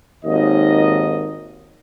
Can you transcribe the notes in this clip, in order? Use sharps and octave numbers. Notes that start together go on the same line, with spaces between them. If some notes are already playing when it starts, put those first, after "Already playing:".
G#1 D#2 D#3 D#5